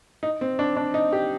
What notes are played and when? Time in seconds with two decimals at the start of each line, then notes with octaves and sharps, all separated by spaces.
0.23 D#4
0.41 C4
0.59 D4
0.77 D4
0.94 D#4
1.13 G4